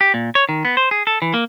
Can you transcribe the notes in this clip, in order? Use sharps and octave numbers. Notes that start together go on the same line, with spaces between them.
G4
A#2
C#5
D#3
B3
C5
G#4
A4
E3
A#3